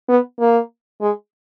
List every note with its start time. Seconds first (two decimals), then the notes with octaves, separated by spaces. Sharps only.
0.09 B3
0.40 A#3
1.01 G#3